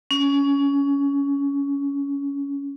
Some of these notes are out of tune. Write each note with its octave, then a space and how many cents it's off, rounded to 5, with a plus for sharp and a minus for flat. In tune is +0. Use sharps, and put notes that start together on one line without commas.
C#4 +20